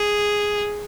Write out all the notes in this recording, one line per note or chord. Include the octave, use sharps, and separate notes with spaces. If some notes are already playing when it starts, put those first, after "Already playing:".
Already playing: G#4